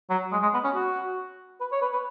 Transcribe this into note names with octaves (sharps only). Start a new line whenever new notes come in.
F#3
G#3
G#3
B3
C#4
F#4
B4
C#5
B4
B4